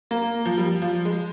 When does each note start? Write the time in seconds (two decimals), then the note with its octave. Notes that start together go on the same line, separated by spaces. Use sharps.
0.11 A#3
0.46 F3
0.58 G3
0.82 F3
1.05 G#3